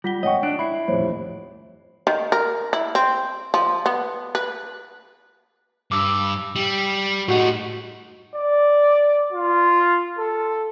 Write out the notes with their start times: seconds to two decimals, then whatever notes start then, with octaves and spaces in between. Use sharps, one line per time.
0.04 G3 F4 F#5 A#6 B6 G7
0.23 G#1 C#5 D#5 F#5 G5 C#6
0.43 D4 F#6 D7
0.59 E4 B5 C7
0.88 D#1 A1 F2 C5 C#5
2.07 D#3
2.32 A#4
2.73 E4
2.95 C4
3.54 F3
3.86 B3
4.35 B4
5.92 G2 D6 E6
6.56 G3
7.28 A2 D#4 F#4 F#5
8.36 D5
9.33 F4
10.19 A4